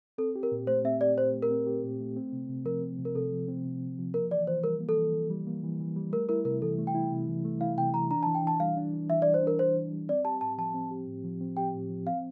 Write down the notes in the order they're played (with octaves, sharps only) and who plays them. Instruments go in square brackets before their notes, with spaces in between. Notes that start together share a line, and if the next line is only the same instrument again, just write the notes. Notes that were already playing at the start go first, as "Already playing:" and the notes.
[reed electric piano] C4 [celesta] A4
[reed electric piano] G4
[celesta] A#4
[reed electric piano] A#2
[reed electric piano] A3 [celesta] C5
[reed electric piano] C4 [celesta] E5
[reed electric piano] G4 [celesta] D5
[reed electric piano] A#2 [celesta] C5
[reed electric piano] A3
[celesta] A#4
[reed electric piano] C4
G4
A#2
A3
C4
C3
C3
[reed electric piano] F3 [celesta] A#4
[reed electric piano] C4
C3
[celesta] A#4
[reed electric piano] C3 [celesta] A4
[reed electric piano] F3
C4
C3
C3
F3
[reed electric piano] A#3 [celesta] A#4
[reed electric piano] E3 [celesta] D5
[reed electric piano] E3 [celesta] C5
[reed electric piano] G3 [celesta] A#4
[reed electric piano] A#3
[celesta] A4
[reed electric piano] E3
E3
G3
A#3
E3
E3
G3
[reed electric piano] A3 [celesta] A#4
[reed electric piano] E4 [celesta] A#4
[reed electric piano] C3 [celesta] A#4
[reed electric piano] E3 [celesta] A4
[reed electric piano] A3
[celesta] G5
[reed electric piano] E4
C3
E3
A3
[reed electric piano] E4 [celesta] F5
[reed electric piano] C3 [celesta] G5
[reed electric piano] E3 [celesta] A#5
[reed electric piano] D4 [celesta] A#5
[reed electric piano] E3 [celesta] A5
[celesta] G5
[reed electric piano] E3 [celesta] A5
[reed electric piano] G3 [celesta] F5
[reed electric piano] D4
E3
[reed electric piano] E3 [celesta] E5
[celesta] D5
[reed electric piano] G3
[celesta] C5
[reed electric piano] D4 [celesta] A#4
[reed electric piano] E3 [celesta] C5
[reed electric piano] E3
G3
[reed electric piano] C4 [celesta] D5
[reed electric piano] G4 [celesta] A5
[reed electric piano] A2 [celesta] A5
[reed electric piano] F3 [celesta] A5
[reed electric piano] C4
G4
A2
F3
C4
[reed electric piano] G4 [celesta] G5
[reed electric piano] A2
F3
[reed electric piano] C4 [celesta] F5